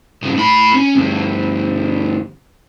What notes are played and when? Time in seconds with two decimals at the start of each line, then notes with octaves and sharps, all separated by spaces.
0.23 G2 C#3
0.35 A2 B5
0.74 C#4
0.95 D2 G2